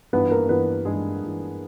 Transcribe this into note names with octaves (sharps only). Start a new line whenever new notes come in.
G2 E3 B3 B4
A#3 A#4
G2 E3 B3 B4
G2 E3 G#3 G#4
G2 E3